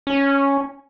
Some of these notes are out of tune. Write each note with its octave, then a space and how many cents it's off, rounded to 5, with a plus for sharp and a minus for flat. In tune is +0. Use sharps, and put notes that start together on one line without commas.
C#4 +0